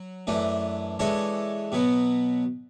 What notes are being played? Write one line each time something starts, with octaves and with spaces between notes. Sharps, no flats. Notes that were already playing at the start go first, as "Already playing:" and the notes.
Already playing: F#3
F#2 E3 A3 D4
E3 G#3 D4 A4 C#5
B2 F#3 B3